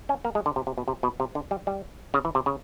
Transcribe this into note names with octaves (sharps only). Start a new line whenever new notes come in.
C#4
A#3
G#3
D3
C3
C3
B2
C3
B2
C3
D3
G3
G3
C#3
E3
C3
C#3